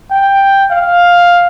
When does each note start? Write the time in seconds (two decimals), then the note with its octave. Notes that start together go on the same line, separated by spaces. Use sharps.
0.11 G5
0.71 F5